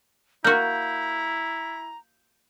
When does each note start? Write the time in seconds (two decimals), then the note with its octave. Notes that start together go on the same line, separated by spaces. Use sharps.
0.44 A#3 E4 F#4 A#5 G6